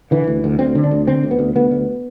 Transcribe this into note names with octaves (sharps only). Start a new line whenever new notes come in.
D3 E3
D2
D2
D2 C4
D3
D4
D2
D3 C4
D2
B3
D2
D2 B3
D2